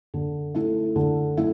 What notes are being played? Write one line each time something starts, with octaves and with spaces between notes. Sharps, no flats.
D3
A3 E4
D3
A3 E4